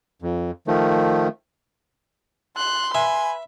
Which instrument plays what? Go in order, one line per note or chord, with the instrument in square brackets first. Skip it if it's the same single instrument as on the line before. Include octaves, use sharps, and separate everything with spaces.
[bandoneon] F2
D#3 F3 A3
[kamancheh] C6 [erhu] F#6
[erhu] B4 [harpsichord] E5 [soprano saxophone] G#5